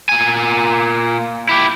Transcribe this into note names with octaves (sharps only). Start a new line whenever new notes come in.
A#2 G#5
E4 G4